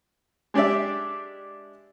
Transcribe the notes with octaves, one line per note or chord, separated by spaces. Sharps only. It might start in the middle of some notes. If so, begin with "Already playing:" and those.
G#3 D4 G4 D5 E5